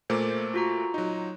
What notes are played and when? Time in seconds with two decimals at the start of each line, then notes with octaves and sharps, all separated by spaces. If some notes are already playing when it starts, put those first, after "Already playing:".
0.10 A#2 A3 A#3 C5 D6
0.54 F4 F#4 A#5
0.94 F#3 D#4